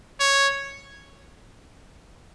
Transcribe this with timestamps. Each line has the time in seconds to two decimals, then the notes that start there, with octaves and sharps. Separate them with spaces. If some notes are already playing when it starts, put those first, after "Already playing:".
0.20 C#5